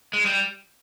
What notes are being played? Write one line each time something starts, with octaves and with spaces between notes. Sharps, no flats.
G#3
G3